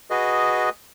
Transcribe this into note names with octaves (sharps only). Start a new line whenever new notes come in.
F#4 G#4 B4 D#5